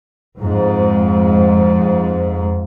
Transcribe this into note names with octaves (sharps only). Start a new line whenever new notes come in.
F2 G#2